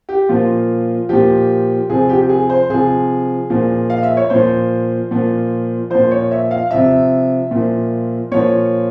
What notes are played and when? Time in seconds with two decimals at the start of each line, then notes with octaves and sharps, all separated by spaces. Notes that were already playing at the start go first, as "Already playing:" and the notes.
0.09 G4
0.29 A#2 F3 F4
1.09 A#2 F3 G4
1.90 C3 F3 G#4
2.09 G4
2.21 G4
2.29 G#4
2.50 C5
2.70 C3 F3 G#4
3.50 A#2 F3
3.90 F5
4.03 E5
4.17 C#5
4.30 A#2 F3 C5
5.11 A#2 F3
5.90 A#2 F3 C5
6.11 C#5
6.31 E5
6.51 F5
6.71 C3 F3 E5
7.51 A#2 F3
8.32 A#2 F3 C#5